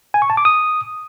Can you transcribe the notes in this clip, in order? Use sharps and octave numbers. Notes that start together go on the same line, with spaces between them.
G#5
C#6
A5
D6
D#6